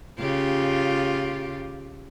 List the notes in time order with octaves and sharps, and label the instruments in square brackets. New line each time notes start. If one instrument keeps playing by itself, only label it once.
[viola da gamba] C#3 F4 G4